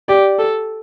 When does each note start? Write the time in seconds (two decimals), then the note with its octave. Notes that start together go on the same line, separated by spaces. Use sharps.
0.08 G4 D5
0.39 A4